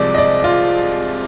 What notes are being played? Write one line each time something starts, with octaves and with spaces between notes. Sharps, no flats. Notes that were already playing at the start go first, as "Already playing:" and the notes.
Already playing: C2 C3 F3 G#3 D5
D#5
D5
F4